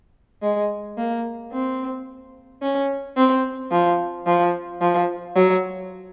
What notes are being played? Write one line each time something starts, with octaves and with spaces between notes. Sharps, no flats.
G#3
A#3
C4
C#4
C4
F3
F3
F3
F#3